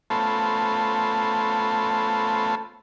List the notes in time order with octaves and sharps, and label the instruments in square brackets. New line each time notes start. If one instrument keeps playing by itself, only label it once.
[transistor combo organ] A3 B3 C#4 F4 A4 C5